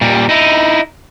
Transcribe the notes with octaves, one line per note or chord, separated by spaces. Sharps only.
A#2 G3
D#4 E4